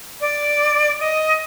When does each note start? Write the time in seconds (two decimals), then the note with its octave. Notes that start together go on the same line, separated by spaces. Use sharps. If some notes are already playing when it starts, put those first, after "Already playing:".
0.21 D5
1.01 D#5